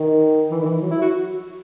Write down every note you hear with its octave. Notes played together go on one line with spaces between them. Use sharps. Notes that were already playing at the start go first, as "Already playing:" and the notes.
Already playing: D#3
E3
D#3
E3
F#3
E4
F#4